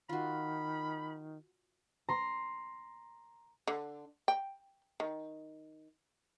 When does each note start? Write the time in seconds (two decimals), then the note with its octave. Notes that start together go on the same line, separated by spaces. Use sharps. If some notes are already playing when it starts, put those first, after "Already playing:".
0.09 D#3 F4 F#4 B5
2.09 A#5 C6
3.67 D3
4.28 G5
5.00 D#3